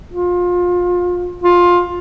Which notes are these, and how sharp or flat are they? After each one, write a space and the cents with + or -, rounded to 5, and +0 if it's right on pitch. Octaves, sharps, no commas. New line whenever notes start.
F4 +25
F4 +15